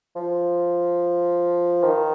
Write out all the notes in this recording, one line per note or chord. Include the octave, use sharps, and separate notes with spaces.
F3
D#3